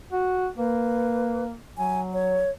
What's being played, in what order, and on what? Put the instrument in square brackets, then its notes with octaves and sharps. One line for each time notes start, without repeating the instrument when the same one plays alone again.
[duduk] F#4
[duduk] A#3 [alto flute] B4
[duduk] F#3 [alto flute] G#5
[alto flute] C#5